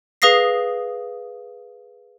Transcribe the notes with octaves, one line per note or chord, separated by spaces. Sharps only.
G#4 B4 F5 D#6 A#6 C7